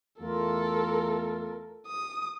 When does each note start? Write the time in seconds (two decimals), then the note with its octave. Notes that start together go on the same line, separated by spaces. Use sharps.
0.20 E2 A3 F4 A4 A#4
1.86 D#6